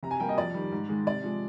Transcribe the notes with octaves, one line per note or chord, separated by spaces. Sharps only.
C3 A#5
G#5
G3 A#3 G5
D#5
F2 D5
D#3 G3
G#2
D#3 G#3
C3 D5
F3 G#3